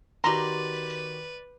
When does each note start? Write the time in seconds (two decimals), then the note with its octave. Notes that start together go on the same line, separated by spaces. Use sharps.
0.24 D#3 F#4 G4 B4 D5 A#5 C6